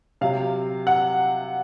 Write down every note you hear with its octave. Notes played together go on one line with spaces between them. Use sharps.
C3 F#3 F5
F#5